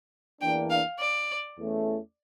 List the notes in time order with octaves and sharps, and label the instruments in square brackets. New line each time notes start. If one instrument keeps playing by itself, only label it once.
[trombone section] E2 E3 A#3 D4 [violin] G5
[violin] F5
D5
[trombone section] E2 E3 A3 C#4